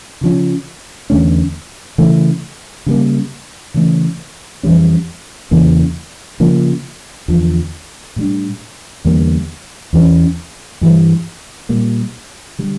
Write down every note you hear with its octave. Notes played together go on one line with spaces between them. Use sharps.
C#3 F3 C#4
E2 D3 A3 C#4
C#3 E3 A3
C#3 G3 A#3
C#3 E3 A3 C#4
F2 E3 G3 C#4
E2 C#3 E3 A#3
C#3 F3 A#3
E2 D3 F3
A2 G3 D4
E2 D3 G3 A#3
E2 E3 A#3 C#4
G2 E3 G3
A#2 G3 A#3
D3 G3